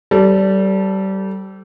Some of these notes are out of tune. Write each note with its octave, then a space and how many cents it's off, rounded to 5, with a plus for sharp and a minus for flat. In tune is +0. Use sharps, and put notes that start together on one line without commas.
G3 -25 A4 +0 C5 +0